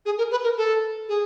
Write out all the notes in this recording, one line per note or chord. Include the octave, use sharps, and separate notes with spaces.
G#4
A#4
B4
A#4
A4
G#4